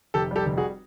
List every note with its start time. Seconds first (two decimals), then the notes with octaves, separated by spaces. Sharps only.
0.14 F1 G4 A4
0.31 G3 G4 A4
0.46 F1
0.57 F#4 G#4